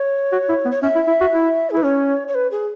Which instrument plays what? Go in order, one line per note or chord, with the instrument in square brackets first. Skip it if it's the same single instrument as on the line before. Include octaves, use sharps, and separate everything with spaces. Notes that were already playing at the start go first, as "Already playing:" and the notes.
Already playing: [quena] C#5
[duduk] F#4
E4
B3
[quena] C#5
[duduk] C#4 [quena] E5
[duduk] E4
E4
F#4
E4
[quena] G#4
[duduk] E4 [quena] B4
[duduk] C#4 [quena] C#5
[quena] C#5
B4
G#4